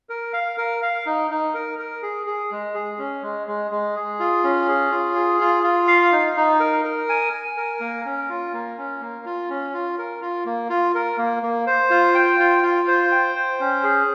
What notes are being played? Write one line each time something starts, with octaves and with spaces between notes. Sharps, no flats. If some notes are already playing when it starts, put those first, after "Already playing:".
A#4
F5
A#4
F5
D#4
D#4
A#4
A#4
G#4
G#4
G#3
G#4
C#4
G#3
G#3
G#3
G#4
F4
C#4
G#4
F4
G#4
F4
F4
F5
D#4
D#4
A#4
A#4
G#5
G#5
A#4
A#3
C#4
F4
A#3
C#4
A#3
F4
C#4
F4
A#4
F4
A#3
F4
A#4
A#3
A#3
C5
F4
G5
F4
F4
C5
G5
C5
C#4
G#4